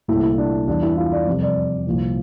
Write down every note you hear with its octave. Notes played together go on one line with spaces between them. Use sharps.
C2 A#2 A3 E4
E4
D4
E2 E3 G3 D4
E4
F4
D5
F2 C3 G3
D5
C2 A#2 F3